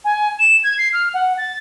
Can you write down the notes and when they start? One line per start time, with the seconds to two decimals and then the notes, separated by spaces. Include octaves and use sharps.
0.05 G#5
0.39 E7
0.64 G#6
0.78 C7
0.93 F6
1.14 F#5
1.38 A6